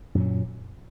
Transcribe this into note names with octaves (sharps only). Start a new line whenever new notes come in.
F#2 A#2 F#3